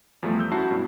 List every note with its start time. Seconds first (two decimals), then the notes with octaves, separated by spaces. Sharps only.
0.23 E2 F3 G3 A3
0.38 D#6 E6 G6
0.52 F#2 E4 F#4 A5 C7
0.71 G2 B2